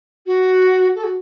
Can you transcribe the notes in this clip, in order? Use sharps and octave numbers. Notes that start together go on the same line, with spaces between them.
F#4
A4
F#4